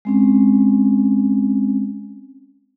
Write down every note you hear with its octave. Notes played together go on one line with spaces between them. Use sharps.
G#3 C4 C#4